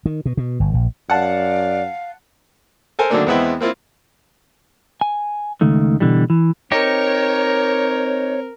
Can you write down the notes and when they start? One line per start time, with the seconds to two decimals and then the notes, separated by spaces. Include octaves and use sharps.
0.05 D#3
0.26 B2
0.37 B2
0.60 G1
0.74 A#1
1.10 F#2 D5 F5 F#5 A5
2.99 A4 A#4 C5 G#5
3.10 D3 D#3 F#3 A3 A#3 D4
3.27 E2 G#3 B3 C4 E4 G5
3.60 A#3 C4 E4 F4
5.01 G#5
5.61 C#2 D#3 A3
6.00 B2 D3 E3 G3
6.30 E3
6.72 C4 D#4 G4 A#4 C#5